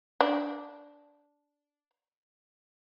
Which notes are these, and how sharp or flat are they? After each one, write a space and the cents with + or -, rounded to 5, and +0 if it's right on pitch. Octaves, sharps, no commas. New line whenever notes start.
D4 -10